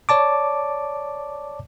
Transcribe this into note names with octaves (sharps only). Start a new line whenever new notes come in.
C#5 D5 A5 D6